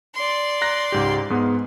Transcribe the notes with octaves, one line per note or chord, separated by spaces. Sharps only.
D5 C6
A#5 F#6 A#6
C#2 G#2 G4
G#2 G#3 B3